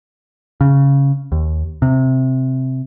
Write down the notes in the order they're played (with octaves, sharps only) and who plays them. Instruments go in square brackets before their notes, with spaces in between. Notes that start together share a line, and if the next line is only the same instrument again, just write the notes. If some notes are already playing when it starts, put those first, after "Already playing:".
[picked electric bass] C#3
D#2
C3